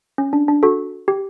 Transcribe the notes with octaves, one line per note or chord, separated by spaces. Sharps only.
C#4
D4
D4
F#4 A4
G4